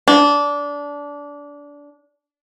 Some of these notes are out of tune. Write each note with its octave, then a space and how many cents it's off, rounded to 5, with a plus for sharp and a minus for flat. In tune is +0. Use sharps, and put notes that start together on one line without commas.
D4 -20